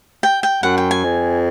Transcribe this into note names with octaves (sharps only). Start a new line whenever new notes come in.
G5
G5
F#2 F#5
G5
G#5
F2